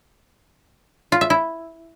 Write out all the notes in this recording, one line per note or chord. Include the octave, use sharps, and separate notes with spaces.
F4
E5
E4